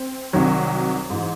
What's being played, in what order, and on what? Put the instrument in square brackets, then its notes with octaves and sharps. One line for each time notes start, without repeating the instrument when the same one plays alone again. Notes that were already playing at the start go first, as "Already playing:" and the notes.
Already playing: [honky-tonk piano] C4
C2 C3 D#3 F#3
G#2 E3